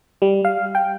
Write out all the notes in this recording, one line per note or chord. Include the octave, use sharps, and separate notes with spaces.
G3
F5
G5